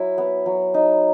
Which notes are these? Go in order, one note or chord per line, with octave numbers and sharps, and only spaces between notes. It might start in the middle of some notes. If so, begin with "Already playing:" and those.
Already playing: F#3 E4
B3
F#3
D#4